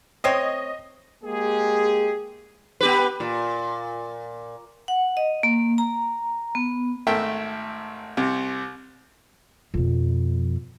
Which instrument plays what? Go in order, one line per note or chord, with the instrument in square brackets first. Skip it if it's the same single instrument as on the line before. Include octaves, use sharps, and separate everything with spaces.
[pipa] A3 C4 C#5 [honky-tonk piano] D#5
[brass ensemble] G#3 A#3 G4 G#4
[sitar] B3 G4 B4
A#2
[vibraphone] F#5
D#5
A#3
A#5
B3
[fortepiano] G#1 A3 A#4 E5 G5 A5
C2 C3
[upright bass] F2 B2